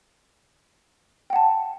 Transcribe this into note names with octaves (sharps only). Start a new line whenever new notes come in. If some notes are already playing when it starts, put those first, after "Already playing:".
F#5 G5 A5